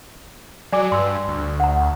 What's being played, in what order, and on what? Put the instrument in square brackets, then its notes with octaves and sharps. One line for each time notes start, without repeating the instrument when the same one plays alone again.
[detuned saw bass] F#3 [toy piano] D5 G#5 D6
[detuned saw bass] G2 [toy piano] C6 E6
[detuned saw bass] D2
[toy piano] F#5 A#5